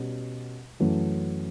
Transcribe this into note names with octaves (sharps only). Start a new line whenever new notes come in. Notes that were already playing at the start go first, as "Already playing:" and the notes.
Already playing: B2 G3 C#4
F#2 E3 A3 C#4 F#4